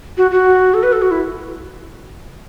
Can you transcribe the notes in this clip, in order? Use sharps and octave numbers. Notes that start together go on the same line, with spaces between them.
F#4
F#4
A4
B4
A4
F#4
E4